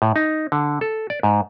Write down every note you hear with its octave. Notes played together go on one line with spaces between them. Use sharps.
A2
D#4
D3
A4
D5
G#2